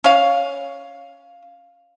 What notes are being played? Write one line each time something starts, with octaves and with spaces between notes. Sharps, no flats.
C#4 F5